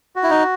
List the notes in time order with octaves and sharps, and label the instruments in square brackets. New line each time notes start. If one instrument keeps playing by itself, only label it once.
[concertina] F#4
[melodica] E4
D#4